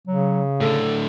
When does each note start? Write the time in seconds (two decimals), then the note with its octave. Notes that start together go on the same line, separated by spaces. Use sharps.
0.07 C#3 F#3
0.61 A2 D3 A4